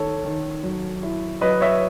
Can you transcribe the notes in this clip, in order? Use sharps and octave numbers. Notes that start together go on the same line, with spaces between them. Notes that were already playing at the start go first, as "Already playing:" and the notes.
Already playing: D#3 A4 C#5
D#3
F#3
E4
F#3 B4 D#5
C#5 E5